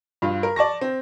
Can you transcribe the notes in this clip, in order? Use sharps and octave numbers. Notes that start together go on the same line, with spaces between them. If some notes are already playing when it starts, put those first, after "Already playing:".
G2 F4
A#4
D5 A5 C#6 A#6
C4